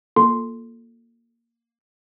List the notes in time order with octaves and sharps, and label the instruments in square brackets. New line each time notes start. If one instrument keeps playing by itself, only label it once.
[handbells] A#3 F4 A4 C6